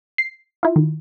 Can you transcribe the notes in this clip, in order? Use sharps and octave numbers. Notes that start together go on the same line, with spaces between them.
C7
E4 F4
D#3